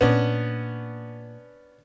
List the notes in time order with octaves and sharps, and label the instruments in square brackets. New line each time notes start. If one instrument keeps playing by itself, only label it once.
[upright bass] A#2 A#3 [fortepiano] B3 C#4 D4